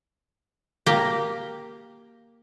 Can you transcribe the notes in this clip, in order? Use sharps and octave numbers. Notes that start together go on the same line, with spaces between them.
A#3 G4